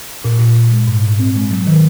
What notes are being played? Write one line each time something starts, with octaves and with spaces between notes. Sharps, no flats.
A#2
A#2
A#2
G#3
G#2
G#2
C4
G#3
F#3
D#3